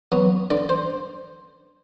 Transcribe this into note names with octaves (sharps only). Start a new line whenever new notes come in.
F#3 B3
D3 D5
C5